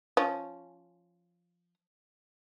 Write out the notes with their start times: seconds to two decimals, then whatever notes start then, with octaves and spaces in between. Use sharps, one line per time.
0.17 F3 C#4